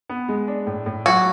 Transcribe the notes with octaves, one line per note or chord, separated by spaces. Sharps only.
B3
G#3
D4
A2
A2
F#3 F#4